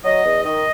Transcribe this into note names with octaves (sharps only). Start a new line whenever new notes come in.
F#3 D#5
E2
D#3 D#5